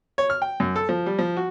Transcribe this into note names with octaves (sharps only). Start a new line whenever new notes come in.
C#5
F6
G5
F#2
A4
F3
G3
F3
F#4